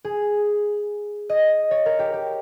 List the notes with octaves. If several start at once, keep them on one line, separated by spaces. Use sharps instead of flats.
G#4
D#5
C#5
A#4
G4
G4